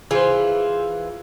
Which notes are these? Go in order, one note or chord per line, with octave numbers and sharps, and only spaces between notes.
E3 F4 G#4 C5